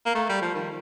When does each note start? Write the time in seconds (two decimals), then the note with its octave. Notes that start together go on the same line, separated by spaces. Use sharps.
0.06 A#3
0.15 A3
0.29 G3
0.42 F3
0.55 D#3